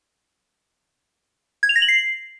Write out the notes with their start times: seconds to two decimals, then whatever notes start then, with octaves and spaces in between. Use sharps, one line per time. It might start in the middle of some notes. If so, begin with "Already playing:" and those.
1.63 G#6
1.69 F7
1.76 A#6
1.82 F#7
1.88 C7